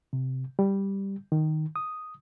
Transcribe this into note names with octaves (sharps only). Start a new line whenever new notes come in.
C3
G3
D#3
D#6